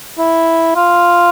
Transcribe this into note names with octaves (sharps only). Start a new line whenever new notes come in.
E4
F4